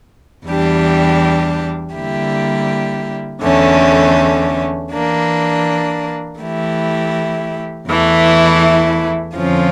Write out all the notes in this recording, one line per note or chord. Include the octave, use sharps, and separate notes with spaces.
E2 E3 G3 D4 G4
D3 G3 A#3 E4 G4
E2 D3 A3 C#4
E3 A#3 D4
E3 A3 E4 G4
E2 E3 A3 E4
F2 D3 F3 C#4 F4